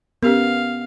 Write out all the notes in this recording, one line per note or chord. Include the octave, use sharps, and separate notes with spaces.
B3 C#4 G4 A#4 F5